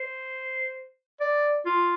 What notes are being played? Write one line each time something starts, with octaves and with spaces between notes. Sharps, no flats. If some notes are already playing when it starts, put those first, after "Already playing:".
Already playing: C5
D5
F4